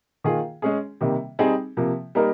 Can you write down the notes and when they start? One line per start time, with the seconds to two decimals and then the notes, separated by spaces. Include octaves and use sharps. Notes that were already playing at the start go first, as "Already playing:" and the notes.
0.24 D#3 A#3 F4 G#4
0.62 G#3 C#4 G#4
1.01 C3 D#3 G3 A#3
1.39 G3 C4 D#4 G#4
1.77 C3 F3 A#3
2.15 G3 A#3 D#4 A#4